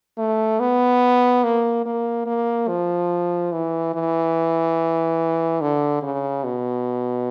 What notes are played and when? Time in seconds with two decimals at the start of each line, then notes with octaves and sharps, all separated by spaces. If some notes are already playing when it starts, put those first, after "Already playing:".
0.18 A3
0.60 B3
1.44 A#3
1.86 A#3
2.26 A#3
2.69 F3
3.52 E3
3.94 E3
5.61 D3
6.03 C#3
6.44 B2